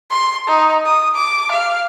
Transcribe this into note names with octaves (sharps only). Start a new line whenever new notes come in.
C6
D#4
D#6
D6
F5